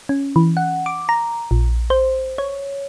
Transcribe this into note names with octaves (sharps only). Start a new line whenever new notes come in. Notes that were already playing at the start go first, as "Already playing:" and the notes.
C#4
E3
F#5
D6
A#5
A#1
C5
C#5